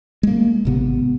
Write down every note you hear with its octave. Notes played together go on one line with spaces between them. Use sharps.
G#3 A#3
G#1 C3 B3